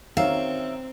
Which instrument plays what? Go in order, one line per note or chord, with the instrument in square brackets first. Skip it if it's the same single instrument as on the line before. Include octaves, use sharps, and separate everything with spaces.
[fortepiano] D#3 F#3 C#4 [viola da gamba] C4 [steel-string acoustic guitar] E5 [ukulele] F5